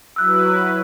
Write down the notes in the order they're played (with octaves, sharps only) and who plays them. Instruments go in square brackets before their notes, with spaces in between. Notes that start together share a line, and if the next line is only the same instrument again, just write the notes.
[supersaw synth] F#3 E4 B4 [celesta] E6 F#6